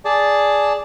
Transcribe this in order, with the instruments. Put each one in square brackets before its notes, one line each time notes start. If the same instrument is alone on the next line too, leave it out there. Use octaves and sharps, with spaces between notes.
[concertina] G#4 D5 A5